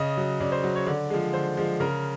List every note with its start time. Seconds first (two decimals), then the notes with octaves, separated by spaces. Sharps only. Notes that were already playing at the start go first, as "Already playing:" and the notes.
Already playing: C#3 D#5
0.17 F#3
0.41 C#3 D5
0.52 C5
0.64 F#3
0.76 C#5
0.87 D3 D5
1.10 F3 G#3
1.33 D3 C5
1.57 F3 G#3
1.80 C#3 A#4